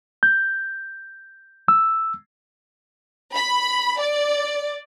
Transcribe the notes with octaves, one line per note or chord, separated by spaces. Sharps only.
G6
E6
B5
D5